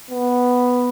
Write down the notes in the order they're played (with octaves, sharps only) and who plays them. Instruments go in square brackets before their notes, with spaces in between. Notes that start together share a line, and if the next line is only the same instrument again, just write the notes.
[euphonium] B3